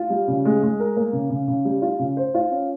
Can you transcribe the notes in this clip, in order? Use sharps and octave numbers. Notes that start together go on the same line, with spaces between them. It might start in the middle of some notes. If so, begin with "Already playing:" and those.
Already playing: F4
G3
C#3
G#3
G#3
A#4
A#3
C#3
C#3
C#3
G3
F4
C#3
C5
F4
C#4